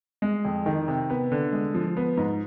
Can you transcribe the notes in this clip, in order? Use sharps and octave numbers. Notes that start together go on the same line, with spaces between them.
G#3
F2
D#3
C3
B3
D3
G#3
F3
B3
G#2